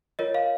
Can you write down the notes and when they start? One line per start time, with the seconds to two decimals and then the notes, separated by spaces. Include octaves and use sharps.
0.19 F4 A#4 C#5 D#5
0.34 F5